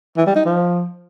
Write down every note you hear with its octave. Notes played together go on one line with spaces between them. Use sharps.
E3
G3
D#4
F3